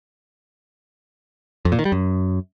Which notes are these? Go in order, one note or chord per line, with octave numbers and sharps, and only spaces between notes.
F2
A#2
D#3
G3
F#2